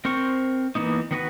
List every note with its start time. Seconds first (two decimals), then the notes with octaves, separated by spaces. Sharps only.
0.05 C4 A#4 C5 C#6
0.75 E3 A#3 B3 D#4
1.11 D#3 B3 F#4 B4